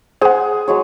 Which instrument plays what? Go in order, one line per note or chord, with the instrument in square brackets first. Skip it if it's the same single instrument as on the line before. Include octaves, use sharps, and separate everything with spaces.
[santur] G#4 [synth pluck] C5 F#5
[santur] F#3 G#3 C#5